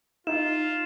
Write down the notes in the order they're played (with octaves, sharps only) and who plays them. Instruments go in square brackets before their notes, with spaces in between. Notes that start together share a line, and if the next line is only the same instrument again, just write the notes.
[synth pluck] D#4 [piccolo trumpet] F4 [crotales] E7